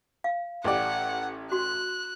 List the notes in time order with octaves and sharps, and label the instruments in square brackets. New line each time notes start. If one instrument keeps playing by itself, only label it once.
[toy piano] F5
[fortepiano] A1 G4 D5 [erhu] F#5
[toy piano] F#4 C6 [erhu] F#6